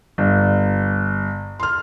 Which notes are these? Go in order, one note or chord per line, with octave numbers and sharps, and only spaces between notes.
G1
C6 F6